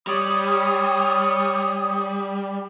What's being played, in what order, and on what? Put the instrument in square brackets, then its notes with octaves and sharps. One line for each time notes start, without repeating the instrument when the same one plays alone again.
[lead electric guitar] G3 [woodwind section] C#5 C#6 D#6